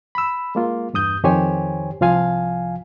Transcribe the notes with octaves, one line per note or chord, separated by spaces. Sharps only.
B5 E6
G#3 A#3 F4
E2 G2 D#6 G6
F2 D#3 G4 C5 C#5 G#5
C2 F3 F4 F5 G#5